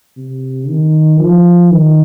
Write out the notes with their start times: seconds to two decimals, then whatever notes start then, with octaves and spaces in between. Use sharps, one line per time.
0.17 C3
0.68 D#3
1.19 F3
1.71 D#3